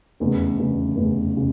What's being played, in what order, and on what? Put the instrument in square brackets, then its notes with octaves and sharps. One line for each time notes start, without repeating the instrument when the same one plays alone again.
[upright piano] F1 E2 C#3
F1 E2 C#3
F1 E2 C#3
C#3